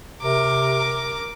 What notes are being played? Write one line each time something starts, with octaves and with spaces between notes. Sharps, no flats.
C3 A#4 D6